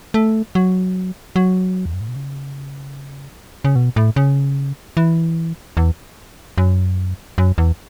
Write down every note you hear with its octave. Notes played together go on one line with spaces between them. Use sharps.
A3
F#3
F#3
E2
F#2
A2
B2
C#3
C#3
B2
A2
C#3
E3
E2
F#2
F#2
E2